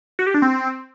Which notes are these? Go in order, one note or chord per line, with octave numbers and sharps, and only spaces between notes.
F#4
G4
D4
C4